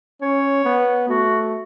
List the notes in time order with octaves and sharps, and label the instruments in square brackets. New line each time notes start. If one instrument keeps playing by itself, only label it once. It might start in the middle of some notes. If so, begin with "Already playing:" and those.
[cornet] C#4 [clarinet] C#5
[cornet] B3
[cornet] A3 [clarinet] F#4